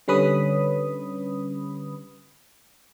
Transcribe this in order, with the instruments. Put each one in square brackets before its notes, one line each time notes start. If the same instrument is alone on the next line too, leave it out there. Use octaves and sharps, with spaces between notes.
[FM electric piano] D3 G3 C#4 B4 B5 D#6